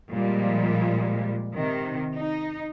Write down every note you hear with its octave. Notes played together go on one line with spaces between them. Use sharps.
A#2 F3 G3 G#3
C3 D#3
D#4